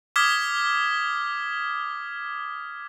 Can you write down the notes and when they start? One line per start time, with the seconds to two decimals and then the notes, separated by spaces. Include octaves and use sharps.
0.16 D6 D#6 F6 G#6 B6 G7